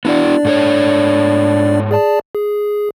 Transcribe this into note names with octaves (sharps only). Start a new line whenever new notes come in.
B3 D4 E4 F#4 D5
G#2 A4 C#5
G#4 D5 A5
G#4